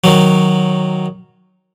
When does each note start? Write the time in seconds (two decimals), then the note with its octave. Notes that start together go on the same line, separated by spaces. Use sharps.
0.04 D#3 F#3